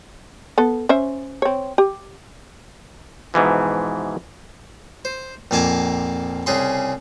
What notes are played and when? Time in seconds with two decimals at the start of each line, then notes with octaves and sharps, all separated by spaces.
0.58 B3 A4
0.89 C#4 C5 E5
1.42 C4 C#5
1.78 G4
3.34 G#2 B2 E3 F3
5.05 C5
5.51 A#1 F2 A#3 G#5 A5 D6
6.46 C2 C#3 G#4 C6